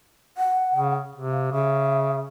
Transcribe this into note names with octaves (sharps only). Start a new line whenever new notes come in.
F#5
C#3
C3
F5
C#3 E5